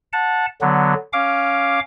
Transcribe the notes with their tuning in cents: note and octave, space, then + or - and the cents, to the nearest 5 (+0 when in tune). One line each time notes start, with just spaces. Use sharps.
F#5 -20 A5 +0
D3 +0 F#3 +0 B3 +0
C#4 +0 F5 +0 D6 +0